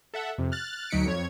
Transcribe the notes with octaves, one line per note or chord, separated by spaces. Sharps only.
A4 E5 F#5
F2 C3
F6 F#6 A6
D2 F#3 D#4 B6 C#7 D7
F2 C#5 G#6